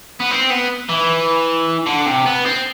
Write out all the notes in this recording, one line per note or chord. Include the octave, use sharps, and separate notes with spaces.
B3
C4
B3
E3
D3
C3
B3
C4